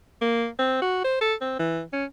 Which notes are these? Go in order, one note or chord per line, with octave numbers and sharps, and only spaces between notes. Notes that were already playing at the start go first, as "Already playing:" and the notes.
A#3
C4
F#4
C5
A4
C4
E3
C#4